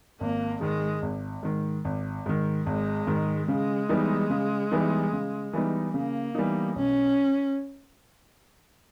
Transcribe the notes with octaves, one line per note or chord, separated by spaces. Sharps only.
G#1 A#3
G#2 D#3 G#3
G#1
G#2 D#3
G#1
G#2 D#3
G#1 G#3
G#2 D#3
C#3 G#3
E3 G3 B3 D#4
C#3
E3 G3 B3 D#4
C#3
E3 G3 B3 D#4
C#3 A#3
E3 G3 B3 D#4
B1 C#4